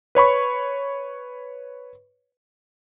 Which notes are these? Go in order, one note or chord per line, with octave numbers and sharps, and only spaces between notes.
B4 C#5 B5 C#6